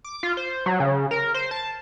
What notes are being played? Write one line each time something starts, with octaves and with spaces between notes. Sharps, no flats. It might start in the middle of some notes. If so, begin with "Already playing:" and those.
D6
F4
C5
F#3
C#3
A#4
C5
A5